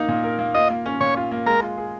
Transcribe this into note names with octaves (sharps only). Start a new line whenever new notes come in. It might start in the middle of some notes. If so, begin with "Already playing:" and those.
Already playing: A#3 D#4
A#2
A#4
A#3
F4 D#5
A#3
C#4
A#2 C#5
F4
A#3
G#3 A#4
F4
G#4